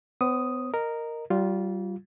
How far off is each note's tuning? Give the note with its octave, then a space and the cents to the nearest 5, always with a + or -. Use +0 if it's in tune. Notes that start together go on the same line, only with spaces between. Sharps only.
B3 +35 C#5 -35 D#6 +0
A#4 -5 D#5 -10
G3 -30 F4 +0